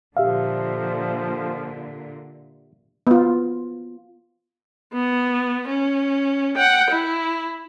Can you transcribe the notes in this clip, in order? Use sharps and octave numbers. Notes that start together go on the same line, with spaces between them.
A#2 D3 F3 G4 E5 F5
B3 F4
B3
C#4
F#5 G5
E4